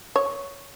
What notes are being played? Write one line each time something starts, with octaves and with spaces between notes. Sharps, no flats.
C#5